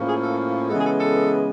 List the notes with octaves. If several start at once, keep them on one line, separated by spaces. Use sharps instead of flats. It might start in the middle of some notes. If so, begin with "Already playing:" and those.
Already playing: A2 F3 A#3 C#4
G#4
A4
C#3 E3 G#3 B3 A4
G#4
A4
A4